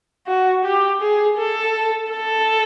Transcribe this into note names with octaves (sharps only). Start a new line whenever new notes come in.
F#4
G4
G#4
A4
A4